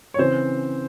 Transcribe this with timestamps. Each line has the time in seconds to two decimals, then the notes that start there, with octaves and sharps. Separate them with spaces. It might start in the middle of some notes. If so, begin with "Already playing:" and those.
0.14 C#5
0.18 C#3 E3 C4 C5